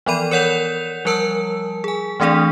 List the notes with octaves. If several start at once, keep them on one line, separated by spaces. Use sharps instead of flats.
E3 F3 B3 D5 B5 D#7
A#4 C#5 F#5 G6 F7
F3 G3 A#4 A5 E6
G#4 G#5
E3 A3 C4 D4 G#4 D5